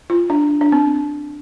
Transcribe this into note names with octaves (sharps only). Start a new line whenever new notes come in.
F4
D4
D4
C4